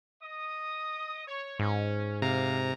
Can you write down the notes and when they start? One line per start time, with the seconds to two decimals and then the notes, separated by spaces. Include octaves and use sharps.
0.22 D#5 D#6
1.27 C#5
1.59 G#2 C#4
2.22 C3 A#3 F5 A#5